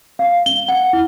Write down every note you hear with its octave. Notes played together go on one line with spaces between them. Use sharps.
F5
G7
F#5
E4